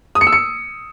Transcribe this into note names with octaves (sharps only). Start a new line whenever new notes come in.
D#6
C#7
E6
C#7